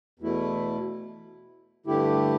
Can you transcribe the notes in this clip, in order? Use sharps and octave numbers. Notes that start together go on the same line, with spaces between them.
E2 B2 A3 E4
G2 D3 A3 E4 G4